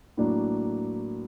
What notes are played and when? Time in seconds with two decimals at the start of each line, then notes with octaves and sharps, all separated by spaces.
0.17 A2 F#3 A#3 D4